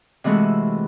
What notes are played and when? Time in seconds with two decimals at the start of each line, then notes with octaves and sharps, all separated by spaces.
0.24 C3 E3 G#3 A3 F#4